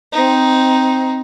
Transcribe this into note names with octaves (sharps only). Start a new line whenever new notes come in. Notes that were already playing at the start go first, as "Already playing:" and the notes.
C4 D#4